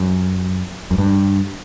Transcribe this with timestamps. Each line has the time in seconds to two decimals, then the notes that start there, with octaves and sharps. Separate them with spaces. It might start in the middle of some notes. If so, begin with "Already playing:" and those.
Already playing: F#2
0.91 F#2
0.98 G2